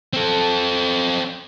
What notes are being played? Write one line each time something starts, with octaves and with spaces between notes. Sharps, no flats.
C4 A4